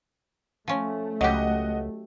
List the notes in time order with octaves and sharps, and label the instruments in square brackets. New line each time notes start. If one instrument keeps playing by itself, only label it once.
[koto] F3 C#4 [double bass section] A3
[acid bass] C#2 [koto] F#3 G4 [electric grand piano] D#5 F#5